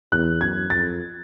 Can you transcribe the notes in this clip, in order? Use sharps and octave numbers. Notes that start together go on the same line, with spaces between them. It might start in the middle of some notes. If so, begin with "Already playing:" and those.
E2 F#6
F#2 G#6
F2 A6